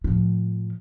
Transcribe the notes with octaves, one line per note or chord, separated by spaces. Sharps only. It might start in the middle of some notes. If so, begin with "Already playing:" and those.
A2 F3